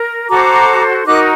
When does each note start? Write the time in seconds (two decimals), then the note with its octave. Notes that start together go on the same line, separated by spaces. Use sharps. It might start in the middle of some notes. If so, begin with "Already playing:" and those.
Already playing: A#4
0.29 F#4 A4 C5 A#5 D6
1.05 D#4 F#4 A#4 D6 F#6